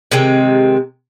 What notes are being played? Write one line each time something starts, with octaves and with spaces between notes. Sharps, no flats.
C3 D#3 G#3 C4